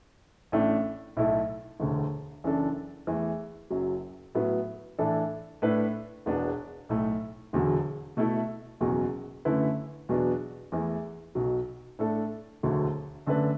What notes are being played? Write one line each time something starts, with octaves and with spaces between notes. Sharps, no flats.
A1 A2 A3 D4
B1 A2 A3 E4 A4
E1 D2 D3
F#1 F#2 E3 D4 A4
E2 E3 A3
F#1 F#2 F#3
A2 F#3 B3
A2 E3 D4 A4
A2 A3 D4 B4
E1 E2 B2 B3 D4
B1 A2 A3
E1 E2 D3 F#3
B2 A3 E4 A4
F#1 E2 B2 F#3
F#2 D3 A3 E4 B4
E2 B2 F#3 B3 D4
E2 E3 A3
B1 B2 F#3
A2 A3 D4 A4
E1 D2 D3 F#3
F#2 D3 A3 D4 B4